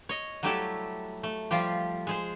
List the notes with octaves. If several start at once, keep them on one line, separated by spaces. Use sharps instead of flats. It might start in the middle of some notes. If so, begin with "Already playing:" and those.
C#5 D#5
F#3 G3 A3 E4 G4 A4
A3
F3 G3 F4 G4
G#3 G#4 C5